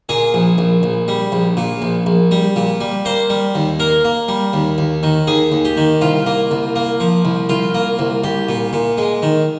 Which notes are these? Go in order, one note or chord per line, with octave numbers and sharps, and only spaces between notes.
A#2 G#4
A#1
A#1
A#1
G3
A#1
A#2
A#1
A#1
G3
A#2
G3
A#3 C5
G3
D#2
A#3 A#4
A#3
G3
D#2
D#2
D#3
D#2 G#4
D#2
G4
D#3
C2 F4
A#3
C2
A#3
F3
C2
C2 F4
A#3
C2
C2 G4
A#2
A#2
G#3
D#3